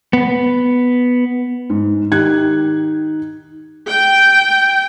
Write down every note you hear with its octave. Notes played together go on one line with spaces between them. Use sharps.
B3
G#2
D#3 D#4 G4 F#6 G#6
G5